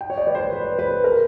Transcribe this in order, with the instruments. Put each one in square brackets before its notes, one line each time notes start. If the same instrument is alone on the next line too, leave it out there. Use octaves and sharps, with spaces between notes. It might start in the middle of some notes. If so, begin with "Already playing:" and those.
[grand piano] G5
C#5
D5
B4
C5
B4
B4
A#4